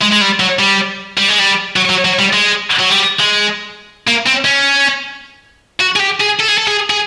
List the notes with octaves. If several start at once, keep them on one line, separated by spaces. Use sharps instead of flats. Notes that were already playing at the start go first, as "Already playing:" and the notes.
G#3
G#3
G3
F#3
G3
G3
G#3
G3
F#3
F#3
F#3
G3
G#3
F#3
G3
G#3
A#3
C4
C#4
F#4
G#4
G4
G#4
A4
G#4
A4
G#4
G#4